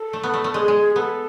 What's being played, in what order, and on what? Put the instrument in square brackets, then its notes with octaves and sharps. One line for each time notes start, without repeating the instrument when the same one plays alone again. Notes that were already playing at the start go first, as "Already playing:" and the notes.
Already playing: [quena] A4
[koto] A3
B3
A3
A3
[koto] G#3 [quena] G#4
[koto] G#3
[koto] B3 [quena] A4